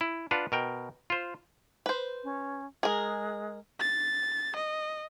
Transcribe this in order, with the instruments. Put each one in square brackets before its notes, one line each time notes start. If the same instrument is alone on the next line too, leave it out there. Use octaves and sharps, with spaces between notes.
[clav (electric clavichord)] E4
D4 F4 B4 F#5
B2 A#4 G5
F4 C5
[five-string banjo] B4 C5
[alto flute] C#4
[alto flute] G#3 [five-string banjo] G#4 A#4
[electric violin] A6
D#5